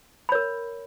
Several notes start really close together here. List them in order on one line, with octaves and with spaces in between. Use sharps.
B5 C#5 A#4